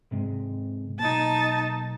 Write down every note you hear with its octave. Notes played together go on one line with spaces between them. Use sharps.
G#2 C3 G#3
B1 A#3 D#4 A5